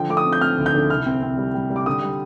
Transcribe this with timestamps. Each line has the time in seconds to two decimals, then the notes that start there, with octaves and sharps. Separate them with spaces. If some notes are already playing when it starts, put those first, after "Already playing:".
Already playing: D3 F3 G5
0.09 A3 D6
0.17 D#6
0.25 C4
0.32 G6
0.41 C4 F6
0.58 D2
0.66 G6
0.74 D3
0.90 C2 F6
1.06 C4
1.23 C4
1.38 G3
1.54 G3
1.70 G3
1.76 D6
1.86 D3 D#6
2.02 G3